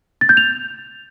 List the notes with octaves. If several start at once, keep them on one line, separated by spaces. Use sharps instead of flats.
A6
G6
F7